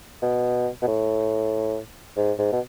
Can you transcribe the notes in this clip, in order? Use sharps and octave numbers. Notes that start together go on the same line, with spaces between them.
B2
B2
A2
G#2
G#2
B2